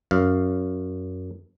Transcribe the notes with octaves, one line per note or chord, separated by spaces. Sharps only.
F#2 F5